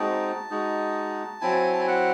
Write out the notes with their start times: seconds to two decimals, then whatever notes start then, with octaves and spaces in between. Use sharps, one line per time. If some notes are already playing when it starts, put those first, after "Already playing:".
Already playing: G#3 C4 D#4 F#4 A5
0.50 G#3 D#4 F#4
1.41 F#3 C4 E4 G#5
1.73 A5
1.80 G#5
1.87 F#5